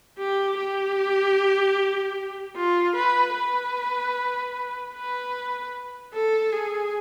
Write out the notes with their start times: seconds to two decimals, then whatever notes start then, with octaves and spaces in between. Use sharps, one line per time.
0.18 G4
0.58 G4
2.56 F4
2.96 B4
3.35 B4
4.94 B4
6.13 A4
6.52 G#4